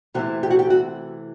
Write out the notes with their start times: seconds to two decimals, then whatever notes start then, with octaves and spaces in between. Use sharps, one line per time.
0.14 C3 E3 A3 C4 E4 F#4
0.43 G4
0.50 F#4
0.59 G4
0.70 F#4